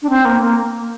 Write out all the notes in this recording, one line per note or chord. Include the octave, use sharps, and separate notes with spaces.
D4
C4
A#3
A#3